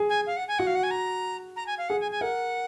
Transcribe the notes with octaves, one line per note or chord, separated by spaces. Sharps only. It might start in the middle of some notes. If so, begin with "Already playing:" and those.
Already playing: G#4
G#5
F5
F#5
G#5
F#4 F#5
F5
F#5
G#5
A#5
A#5
G#5
F5
G#4 F#5
G#5
G#5
A#4 F#5